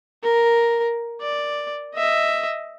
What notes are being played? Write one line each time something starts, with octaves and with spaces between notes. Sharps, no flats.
A#4
D5
D#5 E5